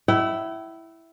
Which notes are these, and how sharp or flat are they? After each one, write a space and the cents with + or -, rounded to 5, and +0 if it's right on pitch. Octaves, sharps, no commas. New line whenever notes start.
E4 +0 G5 -45